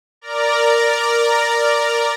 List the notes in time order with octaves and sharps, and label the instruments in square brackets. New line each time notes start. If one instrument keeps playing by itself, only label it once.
[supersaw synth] A#4 D5 A#5